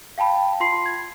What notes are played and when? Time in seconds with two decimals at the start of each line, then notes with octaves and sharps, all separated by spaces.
0.18 F5 G5 A5 B5
0.60 F4 C6 C7
0.86 G#6